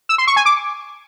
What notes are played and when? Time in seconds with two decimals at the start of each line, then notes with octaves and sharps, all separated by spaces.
0.09 E6
0.18 C6
0.27 C#6
0.36 G#5
0.45 D6